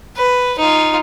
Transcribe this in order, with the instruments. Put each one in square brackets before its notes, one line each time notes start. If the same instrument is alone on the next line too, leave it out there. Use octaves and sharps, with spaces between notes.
[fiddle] B4
D#4 F4